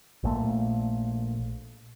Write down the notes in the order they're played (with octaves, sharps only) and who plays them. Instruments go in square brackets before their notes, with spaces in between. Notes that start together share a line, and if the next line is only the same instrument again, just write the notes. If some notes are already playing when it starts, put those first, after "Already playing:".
[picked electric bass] A#1 A#2 A3